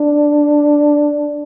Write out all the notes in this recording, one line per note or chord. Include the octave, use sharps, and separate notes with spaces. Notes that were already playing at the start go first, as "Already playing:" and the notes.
Already playing: D4